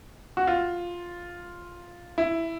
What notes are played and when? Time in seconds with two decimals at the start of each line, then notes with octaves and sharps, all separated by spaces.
0.37 F#4
0.47 F4
2.18 E4